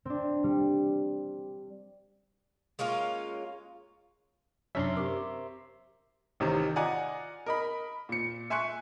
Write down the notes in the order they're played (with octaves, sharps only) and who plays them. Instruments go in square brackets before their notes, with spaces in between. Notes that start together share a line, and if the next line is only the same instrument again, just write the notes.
[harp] C4 D4
G3
[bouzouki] G#3 A#3 C#4 F4
[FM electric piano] F#2 C3 F#3 [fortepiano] C#4 D4 [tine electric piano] E5 A#5 C6
[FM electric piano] C4 C5 [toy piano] G4 A#4 [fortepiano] D6
[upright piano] A1 C3 D#3 A#5
F4 D5 D#5 F#5 G#5 A#5
A#4 D#5 B5
A#2 C#7
E5 G#5 C6 C#6 F#6 C#7